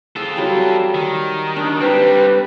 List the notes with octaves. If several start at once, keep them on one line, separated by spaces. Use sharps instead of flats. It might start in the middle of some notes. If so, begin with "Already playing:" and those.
F4 G#4 A4
F#3 G3 G5
D#3
D4
G3 C4 G4 A4 B4